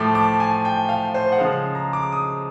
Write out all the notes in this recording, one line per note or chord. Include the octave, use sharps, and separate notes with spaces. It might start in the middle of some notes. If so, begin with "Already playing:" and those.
Already playing: A2 F3 A3 D6
D6
G#5
G5
F5
C5
F#5
C#3 F3 G#3 F5
A#5
D6
D#6